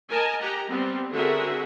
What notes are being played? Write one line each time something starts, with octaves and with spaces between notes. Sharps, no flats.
A#4 D#5 G#5 A5
G4 F#5 A#5
G3 B3 C4
D3 C4 F#4 G#4 A#4 E5